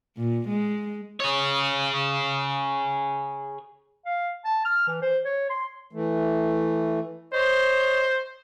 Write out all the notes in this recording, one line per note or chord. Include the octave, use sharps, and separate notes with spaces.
A#2
G#3
G#4 C#5
F5
A5
F6
E3
C5
C#5
C6
E3 A3
C5 C#5 D#5